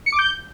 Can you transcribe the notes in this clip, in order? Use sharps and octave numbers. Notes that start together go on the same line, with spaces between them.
C#7
D6
G6